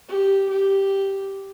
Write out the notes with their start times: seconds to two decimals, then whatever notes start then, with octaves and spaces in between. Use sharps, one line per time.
0.08 G4
0.49 G4